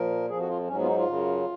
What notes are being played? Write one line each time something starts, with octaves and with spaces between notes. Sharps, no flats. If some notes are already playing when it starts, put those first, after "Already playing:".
Already playing: A#2 F3 A#4
F2 F3 G#4
F#4
F4
G#2 F#3 C#4
B3
F4
D#4
F4
F#2 C#3 F#3